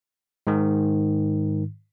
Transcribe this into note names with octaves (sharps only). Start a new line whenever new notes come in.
G#2 D#3